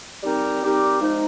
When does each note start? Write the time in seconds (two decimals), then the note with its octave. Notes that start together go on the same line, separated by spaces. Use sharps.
0.23 G3 C4 D#4 G4 A#4
0.62 G3 C4 D#4 G4 A#4
1.00 F3 G#3 D#4